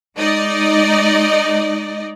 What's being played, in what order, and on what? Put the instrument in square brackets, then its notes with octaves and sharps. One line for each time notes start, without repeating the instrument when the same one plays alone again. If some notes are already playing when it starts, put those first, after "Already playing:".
[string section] G#3 D#4 D5 D#5